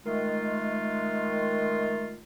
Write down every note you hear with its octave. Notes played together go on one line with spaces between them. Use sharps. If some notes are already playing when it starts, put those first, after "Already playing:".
D#3 G#3 A3 F4